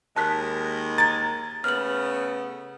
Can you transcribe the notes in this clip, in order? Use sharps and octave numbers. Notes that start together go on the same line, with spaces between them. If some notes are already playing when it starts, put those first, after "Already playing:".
D#2 G#3 A#4 A5 F#6 B6
A#5 G#6 A6
C#3 A3 B3 F6 F#7